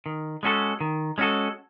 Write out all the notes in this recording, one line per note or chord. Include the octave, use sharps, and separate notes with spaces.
D#3
G#3 C#4 F#4 A4
D#3
G#3 C#4 F#4 A4